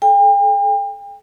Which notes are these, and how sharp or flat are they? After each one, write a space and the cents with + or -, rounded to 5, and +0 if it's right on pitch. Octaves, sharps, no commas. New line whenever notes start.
A4 -40 G5 +40